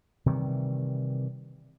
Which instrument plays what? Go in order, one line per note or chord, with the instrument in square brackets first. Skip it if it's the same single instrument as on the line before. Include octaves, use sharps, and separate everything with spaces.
[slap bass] C3 D#3 E3 G3